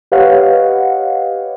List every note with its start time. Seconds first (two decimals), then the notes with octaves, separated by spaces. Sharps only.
0.12 G4 B4 C#5 D#5 F5 F#5